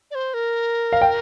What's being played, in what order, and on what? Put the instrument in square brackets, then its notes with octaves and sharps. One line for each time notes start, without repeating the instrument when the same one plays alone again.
[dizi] D5
C5
A#4
[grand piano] F5
G5